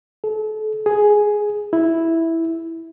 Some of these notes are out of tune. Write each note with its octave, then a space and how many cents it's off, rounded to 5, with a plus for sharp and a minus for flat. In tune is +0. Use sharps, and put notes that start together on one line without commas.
A4 -35
G#4 +5
E4 -5